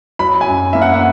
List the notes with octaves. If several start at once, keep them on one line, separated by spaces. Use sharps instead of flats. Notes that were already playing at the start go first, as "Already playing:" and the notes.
F#3 B5
G#5
F#2
A#3 E5
F#5
F#5